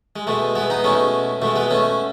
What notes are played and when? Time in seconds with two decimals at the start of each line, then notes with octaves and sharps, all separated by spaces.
0.16 G#3
0.27 B2 G#3 A3
0.56 G#3 B3
0.70 B3 D#4
0.84 B2 G#3 A3 C#4
1.42 B2 G#3 A3
1.56 G#3 B3
1.70 A3 C#4